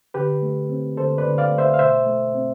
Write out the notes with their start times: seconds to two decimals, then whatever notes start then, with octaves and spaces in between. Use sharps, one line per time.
0.14 D3 G4 B4
0.42 A3
0.69 C4
0.97 D3 A4 C5
1.18 B4 D5
1.25 D3
1.38 D5 F5
1.52 A3
1.58 C5 E5
1.74 F5
1.79 B2 C5 E5
2.06 A3
2.34 C4